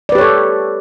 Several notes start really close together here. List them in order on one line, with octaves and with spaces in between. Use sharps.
D5 B4 G4 C#5 A4